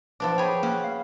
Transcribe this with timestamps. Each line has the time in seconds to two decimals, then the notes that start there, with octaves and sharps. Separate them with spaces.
0.20 F3 B3 D4 D6
0.38 G#4 C#5 G5 B5
0.63 A#3 C#4 F#4
0.84 F5